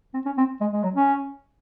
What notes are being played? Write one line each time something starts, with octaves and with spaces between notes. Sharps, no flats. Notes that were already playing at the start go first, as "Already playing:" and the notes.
C4
C#4
C4
G#3
G#3
F#3
C#4